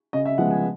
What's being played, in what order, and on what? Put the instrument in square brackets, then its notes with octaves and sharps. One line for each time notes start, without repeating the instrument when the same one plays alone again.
[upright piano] C#3 D#5
E5
F3 G#3 B3 F#5
G#5